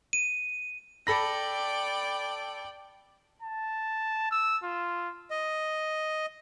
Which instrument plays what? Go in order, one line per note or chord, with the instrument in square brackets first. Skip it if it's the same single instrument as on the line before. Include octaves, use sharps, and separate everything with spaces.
[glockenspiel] D#7
[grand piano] A4 B5 A#6 [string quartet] D5 G5
[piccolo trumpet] A5
E6
F4
[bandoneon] D#5